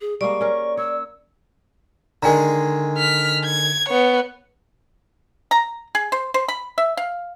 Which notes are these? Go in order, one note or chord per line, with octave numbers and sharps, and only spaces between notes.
G#4
G3 G#3 A#3 D5 C#6
C#4 A#4
C#5 E6
D3 D#3 G#3 G#5 A#5
F6 B6
G#6
B3 C#5
A#5
G#4
C5
C5
B5
E5
F5